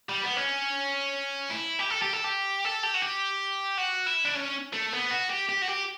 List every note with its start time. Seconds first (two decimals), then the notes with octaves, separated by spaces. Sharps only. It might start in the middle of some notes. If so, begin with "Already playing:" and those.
0.09 G3
0.23 B3
0.37 C#4
1.50 E4
1.79 G4
1.90 A4
2.02 G4
2.13 A4
2.24 G4
2.65 A4
2.83 G4
2.94 F#4
3.02 G4
3.78 F#4
4.07 E4
4.25 D4
4.35 C#4
4.73 A3
4.92 B3
5.11 F#4
5.30 G4
5.49 G4
5.62 F#4
5.68 G4